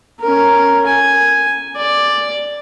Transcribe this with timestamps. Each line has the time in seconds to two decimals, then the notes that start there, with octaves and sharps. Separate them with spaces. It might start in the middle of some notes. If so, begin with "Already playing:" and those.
0.20 C#4 A#4
0.86 G#5
1.77 D5